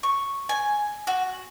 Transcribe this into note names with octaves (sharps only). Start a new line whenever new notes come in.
C#6
G#5
F#4